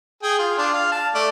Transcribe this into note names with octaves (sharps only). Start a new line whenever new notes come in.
G#4 G5
F4
D4 F4
F5
A5
A3 D5